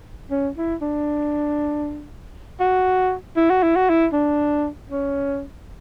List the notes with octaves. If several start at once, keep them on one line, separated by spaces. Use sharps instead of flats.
C#4
E4
D4
F#4
E4
F#4
E4
F#4
E4
D4
C#4